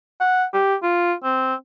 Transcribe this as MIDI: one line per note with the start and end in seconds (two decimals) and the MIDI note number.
0.20 0.44 78
0.53 0.75 67
0.83 1.13 65
1.23 1.54 60